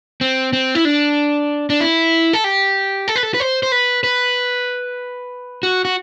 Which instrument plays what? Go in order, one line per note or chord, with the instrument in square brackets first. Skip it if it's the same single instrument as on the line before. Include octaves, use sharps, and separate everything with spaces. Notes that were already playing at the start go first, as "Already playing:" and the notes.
[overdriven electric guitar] C4
C4
E4
D4
D4
E4
A4
G4
A4
B4
A4
B4
C5
C5
B4
B4
F#4
F#4